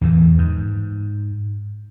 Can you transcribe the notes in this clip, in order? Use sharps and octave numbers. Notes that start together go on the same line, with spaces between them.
E2 A2 E3
G#2